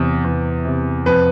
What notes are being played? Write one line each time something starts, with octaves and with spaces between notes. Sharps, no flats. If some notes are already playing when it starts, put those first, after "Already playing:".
Already playing: E2 C3
E2
C3
F2 B4